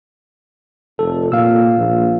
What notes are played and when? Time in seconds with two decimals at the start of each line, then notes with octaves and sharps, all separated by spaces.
0.99 F1 A4
1.32 A#2 F5 E6
1.78 A#1